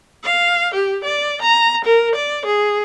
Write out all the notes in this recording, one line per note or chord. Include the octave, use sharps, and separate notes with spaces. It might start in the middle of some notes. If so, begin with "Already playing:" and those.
F5
G4
D5
A#5
A#4
D5
G#4